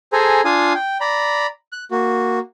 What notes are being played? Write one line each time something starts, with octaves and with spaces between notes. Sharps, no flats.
G#4 A4 C5 G#5 A#5
D4 F4 F5 G#5 D#6
G5
D5 A#5 B5
F#6
A#3 F#4